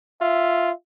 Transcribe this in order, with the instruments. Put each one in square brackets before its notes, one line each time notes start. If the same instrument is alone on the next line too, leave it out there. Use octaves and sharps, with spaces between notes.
[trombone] F4 [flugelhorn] E5